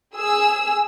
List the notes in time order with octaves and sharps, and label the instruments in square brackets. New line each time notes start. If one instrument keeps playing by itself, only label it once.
[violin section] G#4 E6